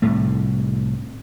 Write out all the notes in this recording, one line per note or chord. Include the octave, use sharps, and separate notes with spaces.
C2 A2 A3